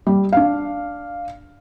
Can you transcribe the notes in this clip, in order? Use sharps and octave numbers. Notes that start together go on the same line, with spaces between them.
G3
D4 F5